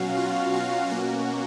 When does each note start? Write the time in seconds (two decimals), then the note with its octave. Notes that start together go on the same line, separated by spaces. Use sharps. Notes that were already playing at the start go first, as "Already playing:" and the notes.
Already playing: B2 F#3 C#4 F#4 F5
0.17 F4
0.54 F#4
0.90 B2 A#3 C#4 F#4